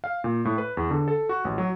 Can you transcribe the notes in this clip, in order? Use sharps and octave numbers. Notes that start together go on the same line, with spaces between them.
F5
A#2
A2
B4
E2
D3
A4
F#4
A1
F#3